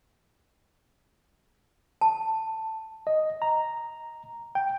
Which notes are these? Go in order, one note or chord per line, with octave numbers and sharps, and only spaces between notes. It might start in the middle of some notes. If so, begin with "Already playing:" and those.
A5
D#5
A#5
G5